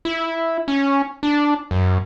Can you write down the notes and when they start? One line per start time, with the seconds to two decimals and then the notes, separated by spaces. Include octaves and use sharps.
0.05 E4
0.68 C#4
1.23 D4
1.71 F#2